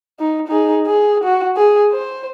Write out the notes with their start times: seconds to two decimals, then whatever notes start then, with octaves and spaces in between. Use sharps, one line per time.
0.19 D#4
0.48 D#4 G#4
0.87 G#4
1.24 F#4
1.57 G#4
1.92 C5